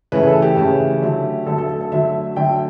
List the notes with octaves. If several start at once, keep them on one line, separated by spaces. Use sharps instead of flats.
C#3 E3 A3 B4
A4
G4
C#3 E3 A3
D3 F#3 A3
D3 F#3 A3 A4
A4
A4
A4
D3 F#3 A3 E5
D3 F#3 A3 G5